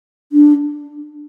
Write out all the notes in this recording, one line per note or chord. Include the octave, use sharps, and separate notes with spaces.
D4